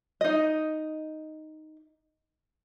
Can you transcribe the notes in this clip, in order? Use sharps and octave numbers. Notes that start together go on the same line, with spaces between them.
D#4 D#5